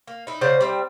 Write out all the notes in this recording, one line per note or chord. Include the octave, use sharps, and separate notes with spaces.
A#3
D#4 E4
C#3 C5 D5 F#5
G3 C4 E5